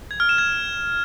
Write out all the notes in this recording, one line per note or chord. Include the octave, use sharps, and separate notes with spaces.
G#6
F6
E7
G#6